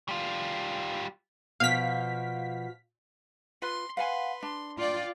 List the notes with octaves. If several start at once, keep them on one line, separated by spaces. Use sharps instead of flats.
G3 F4
B2 F3 F5 B6
F4 B4 C6
B4 F5 F#5 G#5 C6
D4 C6
F4 D5 G5